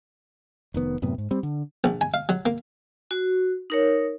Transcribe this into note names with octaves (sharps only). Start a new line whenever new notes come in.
F1 D#3 B3
F#2 A2 C3 B3
G#2
G3 C4
D3
A#1
G#5
F5
F#3
A#3
F#4
D#4 A#4 C#5